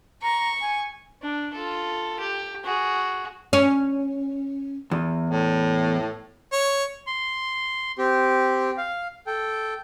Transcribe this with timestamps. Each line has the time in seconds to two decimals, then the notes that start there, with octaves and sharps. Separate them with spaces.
0.22 A#5 C#6
0.61 G#5
1.22 D4
1.54 F4 A4
2.19 G4
2.65 F#4 G#4
3.53 C#4
4.91 E2
5.30 A2
6.52 C#5
7.07 C6
7.98 C4 G4
8.78 F5
9.27 A4 G5